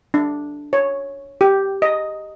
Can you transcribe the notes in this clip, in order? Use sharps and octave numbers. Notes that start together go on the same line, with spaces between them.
D4
C#5
G4
D#5